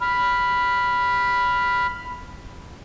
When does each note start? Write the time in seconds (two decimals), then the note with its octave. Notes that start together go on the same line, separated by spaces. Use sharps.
0.01 B5 F6